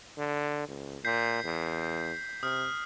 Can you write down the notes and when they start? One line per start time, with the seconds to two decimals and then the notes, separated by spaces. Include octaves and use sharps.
0.18 D3
0.68 C#2
1.05 A#2 G6 B6 C7
1.44 E2
2.43 C3 D#6 F6